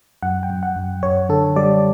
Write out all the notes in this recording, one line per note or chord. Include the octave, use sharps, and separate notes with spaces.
F#2 F#5
G5
F#2
F#5
F#2
F#2 C#5
D3 A4
G3 D5